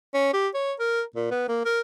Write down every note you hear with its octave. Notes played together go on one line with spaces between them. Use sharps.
C#4
G4
C#5
A#4
A#2
B3
A#3
A#4